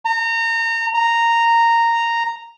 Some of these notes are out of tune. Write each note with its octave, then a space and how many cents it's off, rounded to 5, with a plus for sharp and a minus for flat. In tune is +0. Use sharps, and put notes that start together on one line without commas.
A#5 -30
A#5 -10